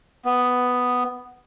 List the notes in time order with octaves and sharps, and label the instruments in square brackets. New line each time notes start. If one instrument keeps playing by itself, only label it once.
[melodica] B3